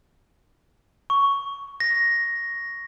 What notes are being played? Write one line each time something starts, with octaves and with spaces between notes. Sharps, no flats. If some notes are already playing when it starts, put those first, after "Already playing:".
C#6
A#6